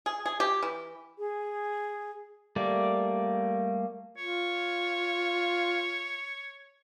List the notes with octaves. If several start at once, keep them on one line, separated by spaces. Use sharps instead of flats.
G#4
G#4
G4
E3
G#4
G3 A3 A#3 D5
F4 C#5